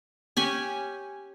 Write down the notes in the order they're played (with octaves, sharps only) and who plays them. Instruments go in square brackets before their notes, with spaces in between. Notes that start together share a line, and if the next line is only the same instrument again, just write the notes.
[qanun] C#4 G4 G#5